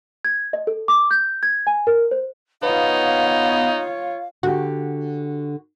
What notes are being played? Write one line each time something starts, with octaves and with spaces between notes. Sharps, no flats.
G#6
D#5
A4
D6
G6
G#6
G#5
A#4
C5
B3 D#4 F4 C#5 F5
D3 F#4 G4